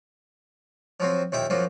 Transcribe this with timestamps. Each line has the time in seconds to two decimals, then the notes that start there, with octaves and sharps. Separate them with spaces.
1.00 F3 F#3 C4
1.32 D#2 A#2 E4 E5 G5
1.50 F#2 F3 F#3 A#3